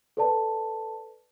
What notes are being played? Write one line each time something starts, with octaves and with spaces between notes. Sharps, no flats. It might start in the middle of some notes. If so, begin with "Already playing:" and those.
A4 B4 D5 A5